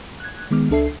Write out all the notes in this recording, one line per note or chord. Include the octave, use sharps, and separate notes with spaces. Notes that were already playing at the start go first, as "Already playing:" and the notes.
F#6 G#6
D#3 G#3 B3 D6 F6
C#2 D4 A4 E5 C7